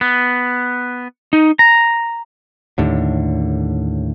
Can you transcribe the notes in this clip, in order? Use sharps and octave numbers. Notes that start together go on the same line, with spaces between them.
B3
D#4
A#5
D#2 A2 D3